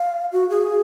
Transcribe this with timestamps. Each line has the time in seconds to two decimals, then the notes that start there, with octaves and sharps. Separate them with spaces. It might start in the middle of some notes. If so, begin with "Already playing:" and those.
Already playing: F5
0.32 F#4
0.50 G#4